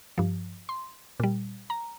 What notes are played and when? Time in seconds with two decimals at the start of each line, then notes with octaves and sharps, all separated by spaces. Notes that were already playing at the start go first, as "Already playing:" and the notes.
0.18 G2 F3
0.69 C6
1.20 A#2 G3
1.70 A#5